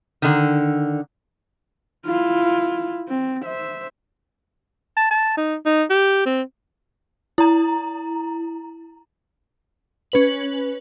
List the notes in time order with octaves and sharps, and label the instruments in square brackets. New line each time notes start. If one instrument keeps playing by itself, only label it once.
[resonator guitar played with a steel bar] D3 D#3
[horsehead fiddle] E4 F4
C4
C5 E5
[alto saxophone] A5
A5
D#4
D#4
G4
C4
[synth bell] E4 A#5
C#4 B4 F#7